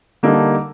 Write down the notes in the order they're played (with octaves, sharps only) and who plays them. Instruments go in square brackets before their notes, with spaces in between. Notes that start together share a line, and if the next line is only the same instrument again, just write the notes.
[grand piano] D3 G3 A#3 D#4 A4